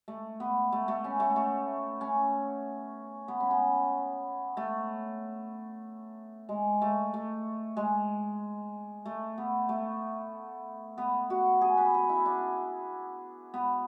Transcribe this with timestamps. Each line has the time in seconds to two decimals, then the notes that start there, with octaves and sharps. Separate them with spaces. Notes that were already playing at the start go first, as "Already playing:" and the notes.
0.08 A3
0.40 B3
0.72 A3
0.88 A3
1.04 C#4
1.20 A3
1.36 A3
2.01 C#4
3.28 B3
3.40 C#4
3.51 B3
4.57 A3
6.49 G#3
6.81 A3
7.14 A3
7.77 G#3
9.05 A3
9.38 B3
9.69 A3
10.98 B3
11.30 F#4
11.61 G#4
11.77 B4
11.94 G#4
12.09 E4
12.26 D4
13.54 B3